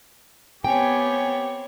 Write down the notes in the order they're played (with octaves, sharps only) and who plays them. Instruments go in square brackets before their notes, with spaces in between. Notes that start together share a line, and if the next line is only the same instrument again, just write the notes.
[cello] B3 G4 [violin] C4 C#5 [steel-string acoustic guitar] G5 [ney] G#5